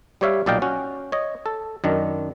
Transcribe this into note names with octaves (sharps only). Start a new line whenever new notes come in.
G3 G4 C#5 E5 F5
B1 A#2 D5 D#5 F5 G5
C#4 F#4
C#5 D#5
A4
F#2 D#3 D4